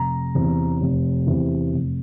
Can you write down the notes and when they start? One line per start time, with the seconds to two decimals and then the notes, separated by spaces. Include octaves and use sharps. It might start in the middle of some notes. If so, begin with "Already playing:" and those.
Already playing: F1 A#5
0.35 E2 C3 E3
0.81 F1
1.27 E2 C3 E3
1.73 F1